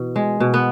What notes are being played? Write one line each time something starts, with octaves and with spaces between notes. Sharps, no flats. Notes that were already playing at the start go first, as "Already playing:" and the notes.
Already playing: B2 E3
G#3
B2
B3